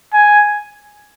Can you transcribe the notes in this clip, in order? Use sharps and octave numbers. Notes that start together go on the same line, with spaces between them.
G#5